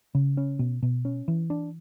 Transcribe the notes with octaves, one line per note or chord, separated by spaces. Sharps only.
C#3
C#4
B2
B2
C#4
E3
D4